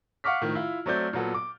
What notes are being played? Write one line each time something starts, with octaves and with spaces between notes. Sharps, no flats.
F5 F#5 C#6 D6 F6 B6
A2 D#3 F3
E4 F4
F#3 A3 C4 D5 G6
A#2 F#3 B3 A4
D6